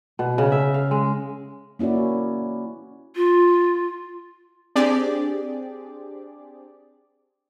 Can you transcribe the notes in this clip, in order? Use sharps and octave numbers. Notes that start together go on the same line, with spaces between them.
B2
C#3
E5
F5
G#3
A#3 C#4 E4 F#4 D5
F4
C4 D4 G4 G#4 D5